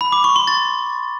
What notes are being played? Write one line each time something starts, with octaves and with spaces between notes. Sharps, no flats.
B5
D6
C#6
C6
A6